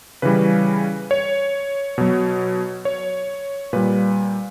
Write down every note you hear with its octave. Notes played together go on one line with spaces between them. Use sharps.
C#3 E3 G3 B4
C#5
B2 F#3
C#5
A#2 G3 B4